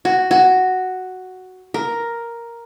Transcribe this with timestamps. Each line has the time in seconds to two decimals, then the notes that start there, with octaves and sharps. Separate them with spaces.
0.05 F#4
0.31 F#4
1.74 A#4